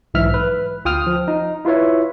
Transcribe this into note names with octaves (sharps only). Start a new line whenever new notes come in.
B1 G#2 E3 E5 F6
B4
D2 F4 G5 D#6 F6
F3
D#4
E4 F4 B4 C#5 E5